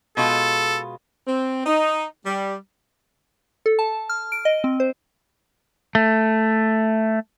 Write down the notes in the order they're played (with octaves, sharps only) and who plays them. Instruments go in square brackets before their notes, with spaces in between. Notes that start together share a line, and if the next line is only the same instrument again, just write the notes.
[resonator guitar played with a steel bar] B2 G#3 F4 [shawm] A4
[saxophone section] C4
D#4
G3
[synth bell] A4
A5
F6
D7
D#5
C4
C5
[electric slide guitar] A3